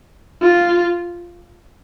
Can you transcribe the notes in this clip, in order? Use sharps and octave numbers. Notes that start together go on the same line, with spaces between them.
F4